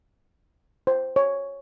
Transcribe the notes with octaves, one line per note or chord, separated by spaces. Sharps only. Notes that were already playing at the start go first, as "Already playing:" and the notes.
C5
C#5